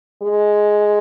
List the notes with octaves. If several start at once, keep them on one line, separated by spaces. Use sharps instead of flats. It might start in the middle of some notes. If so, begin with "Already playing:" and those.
G#3